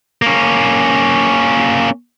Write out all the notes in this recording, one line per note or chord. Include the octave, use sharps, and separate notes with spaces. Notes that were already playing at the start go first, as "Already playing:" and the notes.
A#3 C#4